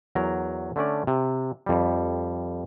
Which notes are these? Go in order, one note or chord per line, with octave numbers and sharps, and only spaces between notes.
E2 F#3 A#4 A#5
D3 A3 C#4 D5
C3
F2 G3